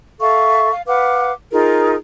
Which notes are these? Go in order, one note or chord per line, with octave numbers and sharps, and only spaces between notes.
A4 E5 F5 C#6
F5
B4 F5 F#5 D6
D#4 F4 G#4 A#4